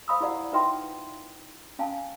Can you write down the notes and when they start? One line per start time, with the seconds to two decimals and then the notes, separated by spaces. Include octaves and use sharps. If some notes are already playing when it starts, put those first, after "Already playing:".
0.08 C5 F5 B5 D#6 E6
0.21 E4 G4 D5 F#5
0.52 D#4 F4 B4 E5 G5 C6
1.79 C#4 F5 G#5 A5